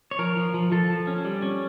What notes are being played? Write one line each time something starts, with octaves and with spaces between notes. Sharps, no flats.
C#5
F3 A#4
F3
F3
F3 A4
F3
C#4
G3
C#4